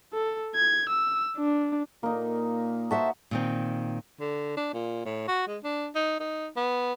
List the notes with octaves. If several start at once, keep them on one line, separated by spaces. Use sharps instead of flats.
A4
G#6
E6
D4
A#2 A#3 D#4
F#4 C5 E5 A5
A#2 D#3 C4
D3
D4
A#2
A2
F#4
G#3
D4
D#4
D#4
B3